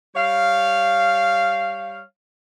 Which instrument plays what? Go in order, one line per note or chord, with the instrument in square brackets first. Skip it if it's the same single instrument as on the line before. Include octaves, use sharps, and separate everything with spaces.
[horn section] G3 C#5 F5